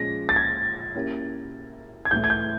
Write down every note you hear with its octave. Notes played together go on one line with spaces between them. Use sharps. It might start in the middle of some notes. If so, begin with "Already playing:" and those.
Already playing: A#2 F3 G#3 C#4 A#6
A6
G#6
A#3 C#4 E4 G4 A#4
G#6
A2 E3 A3 G6
G#6
G6